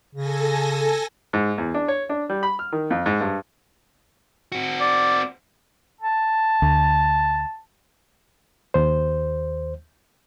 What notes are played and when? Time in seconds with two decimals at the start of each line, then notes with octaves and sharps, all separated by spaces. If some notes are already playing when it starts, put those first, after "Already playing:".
0.15 C#3 A4 G#5 A#6
1.33 G#2
1.58 E2
1.74 D4
1.88 C#5
2.09 D4
2.29 G3
2.43 B5
2.59 F6
2.72 D#3
2.91 F2
3.06 G#2
3.21 G2
4.52 C4 F#4
4.80 D5
6.01 A5
6.62 D2
8.74 D#2 C5